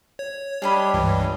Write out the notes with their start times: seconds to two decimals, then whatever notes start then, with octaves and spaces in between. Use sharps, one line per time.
0.19 C#5
0.62 G3 D4 D#5 B5
0.94 C#2 G2 E3